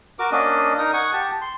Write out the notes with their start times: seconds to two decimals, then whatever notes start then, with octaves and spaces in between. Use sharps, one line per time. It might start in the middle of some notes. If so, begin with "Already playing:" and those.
0.19 F#4 A#4 D6
0.32 A#3 C#4 D4 D#5
0.78 D#4 A#4 D#6
0.93 F#5 G#5 C#6 D#6
1.13 G4 A5
1.41 C6